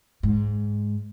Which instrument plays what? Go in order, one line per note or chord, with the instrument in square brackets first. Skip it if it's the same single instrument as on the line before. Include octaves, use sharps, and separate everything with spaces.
[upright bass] G#2